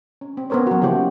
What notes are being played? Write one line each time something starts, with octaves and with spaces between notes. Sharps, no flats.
C#4
C4
B3 C#4 A#4 C5 C#5
F#3 F#4
C#3 F3 A#3 E4 F#4 G4